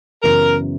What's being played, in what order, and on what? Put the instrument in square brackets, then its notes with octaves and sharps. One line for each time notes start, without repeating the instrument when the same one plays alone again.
[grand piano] F#2 C#3 E3 B3 [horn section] A#4